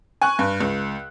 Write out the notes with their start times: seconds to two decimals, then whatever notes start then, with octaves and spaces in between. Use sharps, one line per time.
0.22 G#5 C#6 F#6
0.39 G2
0.61 C#2